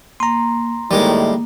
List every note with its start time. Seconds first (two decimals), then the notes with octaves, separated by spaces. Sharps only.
0.20 A#3 A#5 C6
0.91 A2 D#3 G3 G#3 A#3